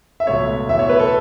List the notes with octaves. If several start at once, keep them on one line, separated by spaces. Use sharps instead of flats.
E5
C#2 B2 A3 C#5
E2 B2 A3 E5
C#5
B4
A4